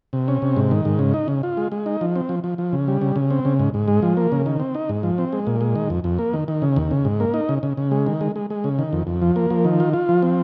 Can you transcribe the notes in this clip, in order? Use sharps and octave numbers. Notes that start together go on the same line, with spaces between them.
C3
C#4
C3
G#2
D#3
G#2
C#3
D#4
C#3
F4
G#3
G#3
D#4
F3
C4
F3
F3
F3
C#3
G3
C#3
C#3
C4
C#3
G#2
G#2
G#3
F3
A#3
C#3
D#3
C4
D#4
G#2
F3
C4
G#3
A#2
G#3
D#3
F2
F2
A#3
D#3
D#3
C#3
D#2
C#3
G#2
A#3
D#4
C#3
C#3
C#3
G#3
D#3
G#3
G#3
G#3
C#3
D#3
F2
F2
F3
A#3
F3
D#3
F4
F4
F3
C4